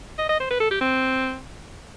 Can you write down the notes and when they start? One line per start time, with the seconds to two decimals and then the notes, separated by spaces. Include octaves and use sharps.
0.18 D#5
0.29 D#5
0.40 C5
0.50 B4
0.60 A4
0.71 G4
0.81 C4